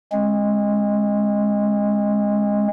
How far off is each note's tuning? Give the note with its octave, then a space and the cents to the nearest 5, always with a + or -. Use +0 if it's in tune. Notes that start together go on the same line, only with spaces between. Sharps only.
G#3 +0 C#4 -40